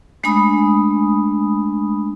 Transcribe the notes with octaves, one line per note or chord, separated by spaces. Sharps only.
G#3 A3 D4 G#5 B5 D#6